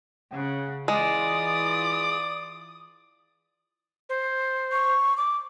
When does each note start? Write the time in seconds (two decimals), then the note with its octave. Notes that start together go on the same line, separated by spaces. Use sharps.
0.31 C#3 F#5
0.88 E3 G#3 F4 D5 D#6
4.09 C5
4.72 C#6
5.17 D6